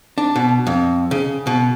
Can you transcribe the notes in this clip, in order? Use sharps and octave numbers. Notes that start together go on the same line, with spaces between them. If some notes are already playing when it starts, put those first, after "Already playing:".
D4
B2
F2
C#3
B2